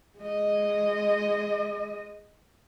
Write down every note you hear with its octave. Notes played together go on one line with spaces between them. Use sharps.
G#3 D#5